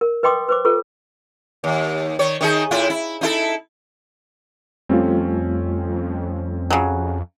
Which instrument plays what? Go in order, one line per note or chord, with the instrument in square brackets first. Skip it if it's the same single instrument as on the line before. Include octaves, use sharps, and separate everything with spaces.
[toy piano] A#4
B4 D#5 G5 C6 D6 D#6
B4 C5 D6
F4 A4 B4
[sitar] D#2
D#3 C#5
D#3 D#4 G#4
A2 E4 F4
E4
D#4 E4 A4
[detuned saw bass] F2 [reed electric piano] G3 A3 F4 [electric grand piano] C4 C#4 A4
[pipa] C#3 F#3